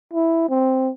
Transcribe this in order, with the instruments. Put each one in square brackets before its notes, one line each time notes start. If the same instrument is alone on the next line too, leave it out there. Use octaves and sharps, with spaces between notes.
[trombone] E4
C4